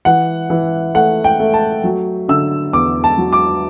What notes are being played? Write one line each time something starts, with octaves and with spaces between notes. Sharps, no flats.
E3 F#5
E3
A3 F#5
G5
A3
A5
F#3
D3 E6
E2 D6
A5
F#3
D6